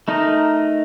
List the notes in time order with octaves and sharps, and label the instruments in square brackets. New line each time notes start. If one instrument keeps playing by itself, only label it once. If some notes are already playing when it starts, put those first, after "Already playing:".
[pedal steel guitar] A3 D#4 A#4 D#5